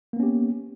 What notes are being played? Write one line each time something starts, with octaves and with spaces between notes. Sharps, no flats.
A#3 B3 C#4 G4